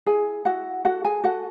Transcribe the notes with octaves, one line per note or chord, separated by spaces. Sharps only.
E4 G#4 G#5
E4 F#4 F#5
F#4 A4 F#5
G#4 G#5
F#4 A4 F#5